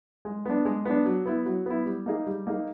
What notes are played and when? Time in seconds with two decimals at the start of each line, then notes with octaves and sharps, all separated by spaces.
0.25 G#3
0.45 B3 D4
0.65 G#3
0.85 B3 D4
1.06 F#3
1.26 B3 E4
1.46 F#3
1.66 B3 E4
1.86 G3
2.06 A#3 D#4 G#4
2.27 G3
2.47 A#3 D#4 G#4